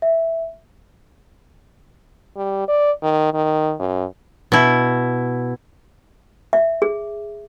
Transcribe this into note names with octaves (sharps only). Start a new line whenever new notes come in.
E5
G3
D5
D#3
D#3
F#2
B2 E4
E5
G#4